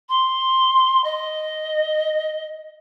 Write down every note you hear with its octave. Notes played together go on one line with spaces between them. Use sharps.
C6
D#5